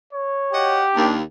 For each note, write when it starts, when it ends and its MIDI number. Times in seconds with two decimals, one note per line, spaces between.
0.13 0.83 73
0.53 0.83 66
0.53 1.06 67
0.53 0.83 75
0.53 0.83 78
0.95 1.20 39
0.95 1.16 62